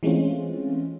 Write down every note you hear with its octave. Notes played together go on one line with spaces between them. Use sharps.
E3 G#3 A3 C4 C#4 F4